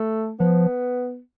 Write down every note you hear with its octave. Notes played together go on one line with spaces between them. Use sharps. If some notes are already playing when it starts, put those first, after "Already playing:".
Already playing: A3
F3 B3